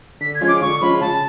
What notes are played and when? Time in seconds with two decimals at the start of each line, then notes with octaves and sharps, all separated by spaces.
0.21 D3 B6
0.35 G#6
0.41 F3 G#3 C#4 F4
0.48 D6
0.61 D3 C#6
0.81 F3 G#3 C#4 F4 B5
1.01 C#3 A5